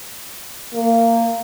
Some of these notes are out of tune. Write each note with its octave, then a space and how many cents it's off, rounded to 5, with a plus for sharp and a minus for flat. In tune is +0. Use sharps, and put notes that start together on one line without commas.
A#3 -20